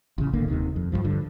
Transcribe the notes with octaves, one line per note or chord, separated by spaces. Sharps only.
A1 C#3
D1 G#1 D3 A#3
D#1 D#2 C3 D#3
F2
G#1 E2 G2 F3
G2 D3